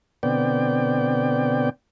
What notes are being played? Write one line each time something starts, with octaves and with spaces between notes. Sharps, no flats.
B2 D3 B3 C4 D5 G5